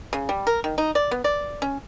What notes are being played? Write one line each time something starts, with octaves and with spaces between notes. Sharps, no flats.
C#3
G3
A#4
D#3
D#4
D5
B3
D5
C#4